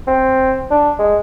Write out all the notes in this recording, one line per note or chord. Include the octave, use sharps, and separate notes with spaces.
C4
D4
G#3